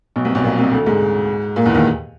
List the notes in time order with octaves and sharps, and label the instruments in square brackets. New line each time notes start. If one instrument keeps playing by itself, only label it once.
[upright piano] B1 B2
C2 C3
B1 B2
A#1 A#2
C2 C3
D2 D3
G#2 G#3
A#2 A#3
E2 E3
D#2 D#3